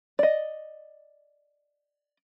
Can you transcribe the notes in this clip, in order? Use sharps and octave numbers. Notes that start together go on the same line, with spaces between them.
D5 D#5